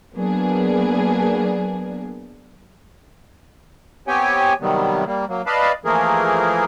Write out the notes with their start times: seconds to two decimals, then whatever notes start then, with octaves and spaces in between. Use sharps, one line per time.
0.14 F#3 A#3 B3 D4 G#4
4.07 B3 C4 G4 C#5 G5 G#5
4.61 C3 D#3 F#3 G3 B3
5.06 G3 A#3
5.29 F#3 A#3
5.47 B4 D5 D#5 F5 A5 B5
5.85 E3 F3 A3 A#3 G#4 A#4